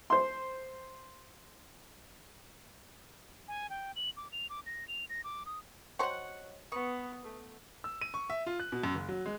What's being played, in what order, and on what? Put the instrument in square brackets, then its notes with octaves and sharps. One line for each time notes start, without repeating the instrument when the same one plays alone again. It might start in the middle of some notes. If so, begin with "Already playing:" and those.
[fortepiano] C5 C6
[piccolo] G#5
G5
F#7
D6
F7
D6
A#6
F7
A#6
D6
D#6
[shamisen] F#3 C5 G5 [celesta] C#5 D#5 [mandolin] F#5 C#6
[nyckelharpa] B3 [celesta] B4 D#6 [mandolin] C#6
[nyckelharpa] A3
[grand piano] E6
D#7
C#6
E5
F4
F#6
B2
F#2
F#1
F#3
G#3